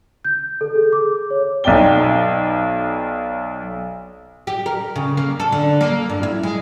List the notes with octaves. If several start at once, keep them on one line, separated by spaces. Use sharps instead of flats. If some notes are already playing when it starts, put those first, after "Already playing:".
G6
A4
G#4
D6
C#5
B1 D#4 D5 G5 G7
G4
A#4
C#3
A#3
A4
D3
A#3
G2
E4
G#3